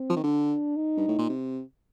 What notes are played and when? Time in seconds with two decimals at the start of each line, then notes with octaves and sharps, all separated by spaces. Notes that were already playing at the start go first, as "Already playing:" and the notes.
Already playing: C4
0.10 F3
0.17 D#3
0.24 D3 D4
0.76 D#4
0.97 G2
1.08 A2
1.19 A#2
1.29 C3